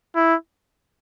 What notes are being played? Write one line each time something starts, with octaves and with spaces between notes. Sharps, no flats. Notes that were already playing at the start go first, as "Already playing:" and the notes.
E4